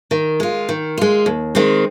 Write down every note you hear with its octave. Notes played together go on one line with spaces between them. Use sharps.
D#3
G#3 F4
D#3
G#3 F4
D#2
D#3 G#3 C4